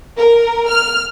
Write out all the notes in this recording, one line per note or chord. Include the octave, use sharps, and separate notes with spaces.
A#4
F6